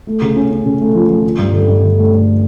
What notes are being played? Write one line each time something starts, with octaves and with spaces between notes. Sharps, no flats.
A3
C#3
C#4
C#4
C#3
A3
F3
F3
D3
G2
D3
G2
D3
A3
A3